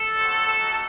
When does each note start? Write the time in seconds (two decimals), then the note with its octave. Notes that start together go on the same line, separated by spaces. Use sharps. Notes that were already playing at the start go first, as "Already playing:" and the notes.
Already playing: A4
0.15 G3 C4 F#4
0.57 D#4 F#4